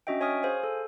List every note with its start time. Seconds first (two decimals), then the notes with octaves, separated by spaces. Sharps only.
0.07 C#4 D4 F#4 D#5 E5 G5
0.21 C#5 G#5 C#6 D#6 F6
0.43 G#4 C5 F5 G#5
0.63 A4